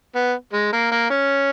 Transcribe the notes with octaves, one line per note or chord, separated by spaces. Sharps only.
B3
G#3
A#3
A#3
C#4